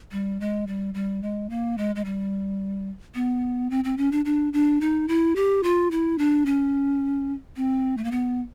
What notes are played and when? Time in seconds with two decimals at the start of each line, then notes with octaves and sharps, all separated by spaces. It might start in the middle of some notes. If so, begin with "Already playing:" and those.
0.12 G3
0.40 G#3
0.67 G3
0.94 G3
1.22 G#3
1.50 A#3
1.78 G#3
1.96 G#3
2.05 G3
3.15 B3
3.70 C4
3.84 C4
3.97 C#4
4.12 D4
4.25 D4
4.53 D4
4.81 D#4
5.08 E4
5.36 G4
5.63 F4
5.91 E4
6.18 D4
6.46 C#4
7.56 C4
7.97 A3
8.04 A#3
8.11 B3